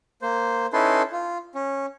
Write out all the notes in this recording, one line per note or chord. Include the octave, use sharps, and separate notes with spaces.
A#3 C5
C#4 D#4 E4 A4 B4 C6
F4
C#4